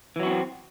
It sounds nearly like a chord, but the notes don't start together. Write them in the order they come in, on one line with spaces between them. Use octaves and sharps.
E3 F#3 F#4 C#4 C4